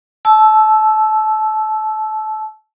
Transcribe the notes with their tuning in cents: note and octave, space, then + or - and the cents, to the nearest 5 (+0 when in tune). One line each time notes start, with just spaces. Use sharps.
A5 -25 E6 +0